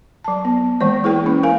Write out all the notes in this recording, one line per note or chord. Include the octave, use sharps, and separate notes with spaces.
F#3 A5
B3
E3 G#3 A#3 C5
E4 G#4 B4 G5
A#3 C#4 E4
A#4 F5 G#5